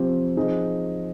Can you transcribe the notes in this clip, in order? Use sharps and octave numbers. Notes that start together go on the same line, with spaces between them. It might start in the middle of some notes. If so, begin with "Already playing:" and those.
Already playing: C3 F3 C4 G4
F3 C4 D#4 G#4